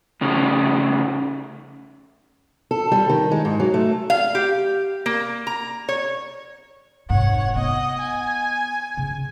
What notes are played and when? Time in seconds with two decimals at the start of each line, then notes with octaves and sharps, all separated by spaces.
0.21 A2 C#3 C#4 D#4
2.71 A4
2.92 G3
3.09 D#3
3.31 G#3
3.45 G#2
3.60 F#3
3.74 A3
4.10 F5
4.35 G4
5.06 A#3
5.47 A#5
5.89 C#5
7.10 F1 G#2 C#5 F#5
7.56 B3 D#5 F#5
8.01 G#5
8.97 C#3